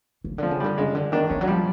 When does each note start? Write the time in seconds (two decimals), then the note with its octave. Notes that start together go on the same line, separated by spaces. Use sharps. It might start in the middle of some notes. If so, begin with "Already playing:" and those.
0.24 C#3
0.38 D3 F3
0.51 C#3
0.60 D3 G3
0.78 C#3 G#3
0.95 D3
1.12 D#3 D4
1.30 E3 C#4
1.41 F#3
1.47 F3 G3